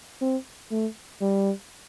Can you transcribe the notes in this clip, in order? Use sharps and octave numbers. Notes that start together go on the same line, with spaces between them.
C4
A3
G3